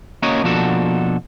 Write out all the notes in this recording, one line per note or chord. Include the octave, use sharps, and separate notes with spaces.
A#3 C#4 F#4 A#4 C#5 D#5
B2 F3 A#3 D4 F#4 A4